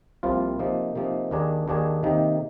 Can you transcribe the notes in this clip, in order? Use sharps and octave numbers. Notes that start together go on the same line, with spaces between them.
C2 C3 F3 A#3 F4
C3 F3 A#3 D#4
C3 F3 A#3 D#4
D#2 D#3 A#3 D4 G#4
D#2 D#3 A#3 D4 G#4
C3 D#3 A#3 D#4